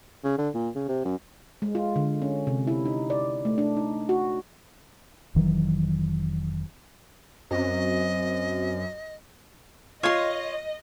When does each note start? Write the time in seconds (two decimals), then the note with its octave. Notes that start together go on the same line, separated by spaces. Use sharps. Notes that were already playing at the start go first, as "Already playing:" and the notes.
0.24 C#3
0.38 D3
0.54 A#2
0.75 C#3
0.88 C3
1.05 F#2
1.62 G#3
1.75 F4
1.96 D3
2.22 C#4
2.47 C3
2.67 E4
2.86 D#4
3.10 D5
3.45 A3
3.58 D4
3.77 D#4
4.09 F#4
5.35 F1 D#3 E3 F#3
7.51 F#2 C4 F#4 C5 D#5
10.03 F4 C#5 D#5 C6